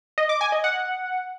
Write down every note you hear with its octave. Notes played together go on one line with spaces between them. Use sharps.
D#5
D6
G#5
D#5
F#5